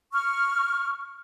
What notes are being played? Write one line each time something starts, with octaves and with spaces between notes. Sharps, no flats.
C#6 F6